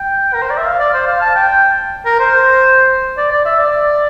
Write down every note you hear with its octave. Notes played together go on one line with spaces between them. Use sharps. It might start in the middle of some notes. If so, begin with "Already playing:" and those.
Already playing: G5
A#4
C5
D5
E5
F5
D5
C5
F5
A5
G5
A#4
C5
D5
D5
E5
D5